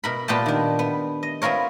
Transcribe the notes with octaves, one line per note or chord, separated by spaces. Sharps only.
B2 A#4 B5
A#2 B3 G4 G5 A5
D#3 D4
B3
D#5
B3 C4 F4 A#4 C#5